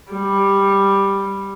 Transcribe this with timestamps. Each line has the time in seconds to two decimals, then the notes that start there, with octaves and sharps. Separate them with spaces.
0.12 G3